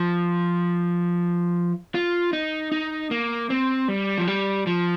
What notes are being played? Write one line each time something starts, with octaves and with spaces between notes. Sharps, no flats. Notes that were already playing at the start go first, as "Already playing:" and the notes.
Already playing: F3
F4
D#4
D#4
A#3
C4
G3
F3
G3
F3